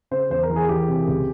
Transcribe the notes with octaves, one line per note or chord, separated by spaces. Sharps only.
C#3 C5
E2 C5
A#4
E3
G#4
E3 G4
C3
C#2